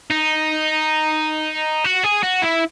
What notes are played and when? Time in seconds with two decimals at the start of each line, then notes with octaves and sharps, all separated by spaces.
0.10 D#4
1.84 F#4
2.04 G#4
2.23 F#4
2.42 E4